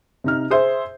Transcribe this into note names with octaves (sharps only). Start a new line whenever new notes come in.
C3 D#4 F6
G#4 C5 E5